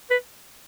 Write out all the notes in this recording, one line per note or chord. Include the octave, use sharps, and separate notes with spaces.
B4